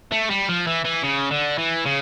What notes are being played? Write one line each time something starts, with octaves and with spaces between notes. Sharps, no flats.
A3
G3
F3
E3
E3
C#3
D3
E3
C#3